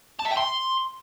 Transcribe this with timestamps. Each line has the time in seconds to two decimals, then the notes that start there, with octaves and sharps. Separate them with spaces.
0.20 A5
0.25 E5
0.31 G5
0.37 C6